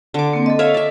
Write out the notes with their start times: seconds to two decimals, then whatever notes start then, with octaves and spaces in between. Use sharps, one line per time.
0.14 D3 D6
0.33 A#3 C4
0.46 A4 D#5
0.59 C#5 E5 F5
0.74 D5 E5